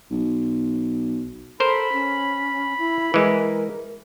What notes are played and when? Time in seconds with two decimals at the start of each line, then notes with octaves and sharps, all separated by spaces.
0.11 B1
1.60 A4 A#4 C5 B5
1.93 C#4
2.78 E4
3.14 E3 G#3 A#4